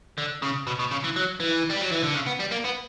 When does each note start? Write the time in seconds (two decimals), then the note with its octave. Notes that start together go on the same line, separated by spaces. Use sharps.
0.18 D3
0.42 C#3
0.67 B2
0.79 B2
0.91 C#3
1.04 E3
1.16 F#3
1.40 E3
1.70 G3
1.81 F#3
1.92 E3
2.03 D3
2.14 C#3
2.26 B3
2.39 G3
2.51 A#3
2.64 B3